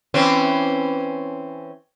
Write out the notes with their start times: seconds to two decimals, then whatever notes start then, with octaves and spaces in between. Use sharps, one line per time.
0.14 E3 C4 C#4